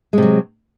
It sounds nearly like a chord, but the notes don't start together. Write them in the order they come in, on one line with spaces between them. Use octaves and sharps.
G#3 C3 F#3